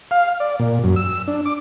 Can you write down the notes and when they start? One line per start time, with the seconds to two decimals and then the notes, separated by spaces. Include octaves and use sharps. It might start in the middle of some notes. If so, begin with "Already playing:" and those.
0.11 F5
0.40 D5
0.59 A#2
0.84 F#2
0.96 E6
1.28 D4
1.46 D6